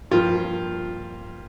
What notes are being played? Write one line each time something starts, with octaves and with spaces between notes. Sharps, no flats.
G2 F3 A#3 F4